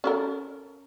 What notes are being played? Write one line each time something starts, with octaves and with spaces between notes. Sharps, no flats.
C#4 A4 A#4